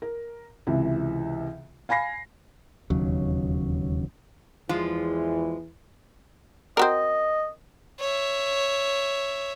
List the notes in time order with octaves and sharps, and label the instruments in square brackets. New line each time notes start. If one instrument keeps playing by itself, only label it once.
[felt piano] A#4
C#2 C3 E3
F5 G#5 B5 A#6 C7
[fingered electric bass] E1 D#2 C#3 F#3
[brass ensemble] E2 E3 [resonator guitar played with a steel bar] F3 G#3 F4
[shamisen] C4 F#4 A#4 [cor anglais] D#5
[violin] C#5 E5